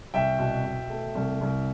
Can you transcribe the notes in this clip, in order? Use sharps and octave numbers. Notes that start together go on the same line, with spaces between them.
C2 E5 G5
B2
B2
A3
C2
C2